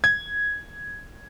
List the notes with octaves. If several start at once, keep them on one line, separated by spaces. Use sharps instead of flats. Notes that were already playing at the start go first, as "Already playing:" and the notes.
G#6